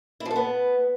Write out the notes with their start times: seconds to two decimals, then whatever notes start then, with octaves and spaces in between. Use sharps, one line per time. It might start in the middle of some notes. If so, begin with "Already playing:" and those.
0.20 E4
0.25 F3
0.31 A4
0.36 B3